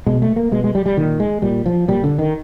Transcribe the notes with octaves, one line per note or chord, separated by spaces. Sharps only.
B2 G#3
A3
A#3
B2 G#3
G#3
G3
G3
A#2 D#3
G#3
A#2 G3
F3
A#2 G3
D3
D#3